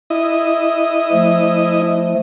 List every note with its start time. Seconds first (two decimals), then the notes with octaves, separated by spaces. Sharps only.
0.10 E4 D#5
1.12 F3 A3